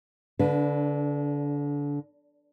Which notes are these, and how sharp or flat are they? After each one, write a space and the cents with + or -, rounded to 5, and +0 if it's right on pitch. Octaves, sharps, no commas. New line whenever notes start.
D3 -30 D4 +0 B4 +0